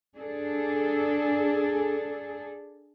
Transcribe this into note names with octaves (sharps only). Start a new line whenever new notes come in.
D4 G#4 A4